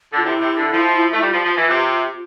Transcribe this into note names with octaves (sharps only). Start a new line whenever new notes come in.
D3 F4
C3 E4
C3
D3
F3
A3
G3 F4
F3
F3
E3
C3